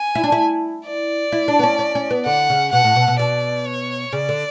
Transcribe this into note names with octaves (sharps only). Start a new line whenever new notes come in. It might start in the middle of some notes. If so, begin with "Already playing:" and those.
Already playing: G#5
E4
D4
E4
D5
E4
D4
B3
C#4
C#4
C#4
B3
D3 F#5
C#3
B2 F#5
A2
B2
B2
B2 D5
C#5
C#3 D5
D3